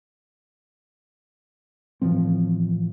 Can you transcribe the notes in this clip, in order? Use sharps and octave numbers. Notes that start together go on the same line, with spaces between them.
A2 E3 F3 C4